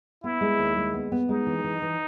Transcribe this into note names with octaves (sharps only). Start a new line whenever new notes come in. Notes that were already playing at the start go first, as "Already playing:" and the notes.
B3 E4
G#3
D#2
G#3
B3
B3
G#3 D#4
E3
E3
E3